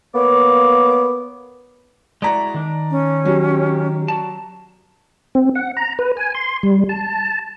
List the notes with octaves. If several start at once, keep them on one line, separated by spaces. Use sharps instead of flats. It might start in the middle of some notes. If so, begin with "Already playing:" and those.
A#3 B3 C#5 D6
G#3 E4 F#4 D5 A#5
D#3 D4
C#4
F#3 G4
F#4 D5 A5
C4
F#5
A#5
B4
G#5
C6
G3
A5